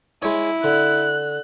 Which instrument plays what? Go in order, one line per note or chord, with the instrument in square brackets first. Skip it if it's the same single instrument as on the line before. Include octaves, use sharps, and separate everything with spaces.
[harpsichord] G#3 C#5 [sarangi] E4
[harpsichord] D3 [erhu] F#6